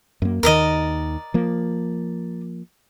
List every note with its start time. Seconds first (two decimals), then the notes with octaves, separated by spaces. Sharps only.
0.22 F#2 A#3
0.43 D#2 D#3 A#4 D5 D#5
1.34 F3 A#3